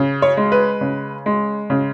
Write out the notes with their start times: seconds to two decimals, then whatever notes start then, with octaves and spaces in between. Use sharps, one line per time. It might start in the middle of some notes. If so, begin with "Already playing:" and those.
Already playing: C#3
0.22 C#5
0.37 G#3
0.52 B4
0.81 C#3
1.26 G#3
1.70 C#3